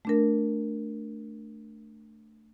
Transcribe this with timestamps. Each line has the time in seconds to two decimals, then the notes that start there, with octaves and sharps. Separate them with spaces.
0.05 A3 D4 A#4